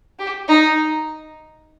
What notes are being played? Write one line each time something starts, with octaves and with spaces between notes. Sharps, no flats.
G4
D#4